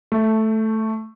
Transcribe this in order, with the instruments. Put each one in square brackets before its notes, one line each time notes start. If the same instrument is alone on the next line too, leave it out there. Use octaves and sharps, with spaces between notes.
[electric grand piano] A3